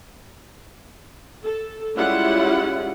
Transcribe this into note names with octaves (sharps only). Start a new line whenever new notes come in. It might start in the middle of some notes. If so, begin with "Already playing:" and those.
A4
G3 G#3 C#4 E4 F4 F#5